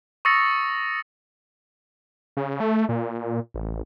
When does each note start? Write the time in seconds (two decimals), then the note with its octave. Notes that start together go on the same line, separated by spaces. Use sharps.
0.25 C#6 D#6 E6 A6 A#6 C#7
2.37 C#3
2.60 A3
2.89 A#2
3.54 A1